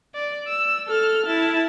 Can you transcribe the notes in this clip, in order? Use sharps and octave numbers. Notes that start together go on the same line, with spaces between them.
D5
E6
A4 F6
E4 A5